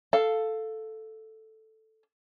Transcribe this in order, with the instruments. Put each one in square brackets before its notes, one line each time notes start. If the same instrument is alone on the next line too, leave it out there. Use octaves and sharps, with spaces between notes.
[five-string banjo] A4 F5